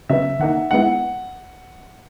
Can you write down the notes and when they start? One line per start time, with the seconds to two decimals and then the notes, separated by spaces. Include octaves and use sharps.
0.09 C#3 F#3 B3 E5
0.40 D#3 A#3 D#4 F#5
0.71 D#3 G#3 B3 E4 F#5